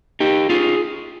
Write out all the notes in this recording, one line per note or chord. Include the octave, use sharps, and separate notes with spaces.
D#4 G4
F4 G#4